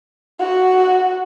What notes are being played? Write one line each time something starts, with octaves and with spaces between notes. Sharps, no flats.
F#4